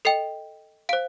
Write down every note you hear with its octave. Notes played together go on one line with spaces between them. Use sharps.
A4 D#5 G5 C7
C5 F5 D7